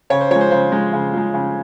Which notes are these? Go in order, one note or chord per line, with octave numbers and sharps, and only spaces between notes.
C#3 C#5
C5
F3 G#3 C#5
C5
C#3 C5
F3 G#3
C#3
F3 G#3
C#3